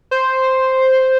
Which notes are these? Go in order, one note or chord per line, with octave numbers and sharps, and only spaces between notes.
C5